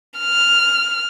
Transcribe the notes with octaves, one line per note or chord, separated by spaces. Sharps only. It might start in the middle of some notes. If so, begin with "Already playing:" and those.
F6